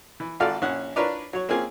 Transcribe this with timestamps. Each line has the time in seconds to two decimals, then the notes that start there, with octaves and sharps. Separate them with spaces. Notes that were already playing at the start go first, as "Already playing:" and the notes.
0.20 E3
0.40 G#1 F4 F#4 A4 D5 F5
0.62 A#1 C#4 F#5
0.96 D4 F4 A#4 B4 C#5 D5
1.33 F#3 C#5
1.49 A#3 C4 C#4 F4 G#4